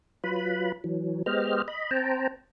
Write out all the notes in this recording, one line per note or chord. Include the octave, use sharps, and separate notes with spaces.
F#3 F4 B4 B5
E3 F#3
G#3 B3 G4 C5 D#5 F6
D#5 B5
C4 C5 G5 A5 A#5